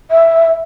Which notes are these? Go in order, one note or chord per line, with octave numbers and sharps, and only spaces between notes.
E5